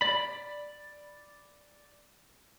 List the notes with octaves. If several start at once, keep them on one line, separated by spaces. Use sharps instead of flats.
D5 B5